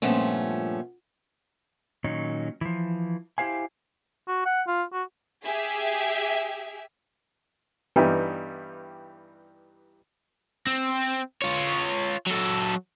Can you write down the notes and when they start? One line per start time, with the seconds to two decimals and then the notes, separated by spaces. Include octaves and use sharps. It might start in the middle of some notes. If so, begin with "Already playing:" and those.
0.02 G2 A#2 F3 A3 B3 C#4
2.04 A#2 D#3 F#3 C#4 D#4
2.61 E3 F3
3.38 E4 G4 C5 F5 G#5
4.28 F#4
4.45 F#5
4.67 F4
4.93 F#4
5.44 G4 G#4 E5
7.96 G2 E3 G3 B3 D#4
10.67 C4
11.42 F4 C#5
12.26 F#3 A4